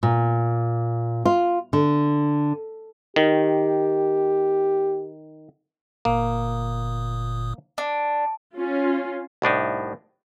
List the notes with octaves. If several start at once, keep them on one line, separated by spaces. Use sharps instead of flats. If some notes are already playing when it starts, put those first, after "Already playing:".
A#2
F4
D3
D#3 G4
G1 A#2 A#3 D#6
D4
C#4 F4
C2 A2 D4 D#4